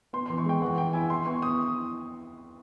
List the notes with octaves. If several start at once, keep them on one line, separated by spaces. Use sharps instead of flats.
B3 C6
C6
E3
C#6
G#3 G5
E3 F#5
E3 G5
E4 G#5
E4 C6
B3 C#6
E4 D#6